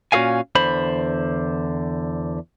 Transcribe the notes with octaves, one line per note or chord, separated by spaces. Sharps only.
A#2 C#4 F#4 A4 F5 G#5
E2 D3 C5 B5